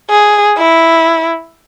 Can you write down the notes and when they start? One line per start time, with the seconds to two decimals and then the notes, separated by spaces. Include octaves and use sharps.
0.10 G#4
0.58 E4